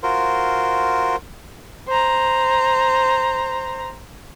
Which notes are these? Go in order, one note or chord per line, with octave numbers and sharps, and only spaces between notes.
F4 F#4 A#4 C5
C5 A#5